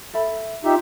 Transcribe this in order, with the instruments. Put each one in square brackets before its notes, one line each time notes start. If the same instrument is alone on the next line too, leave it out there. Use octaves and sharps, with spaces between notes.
[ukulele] A4 E5 B5
[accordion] D#4 G4 E5 [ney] F4